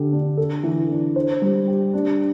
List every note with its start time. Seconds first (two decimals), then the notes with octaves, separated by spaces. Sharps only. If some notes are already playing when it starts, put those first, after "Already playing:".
Already playing: D3 G4
0.12 D4
0.37 A4
0.63 E3
0.90 D4
1.16 C5
1.42 G3
1.67 G4
1.94 D4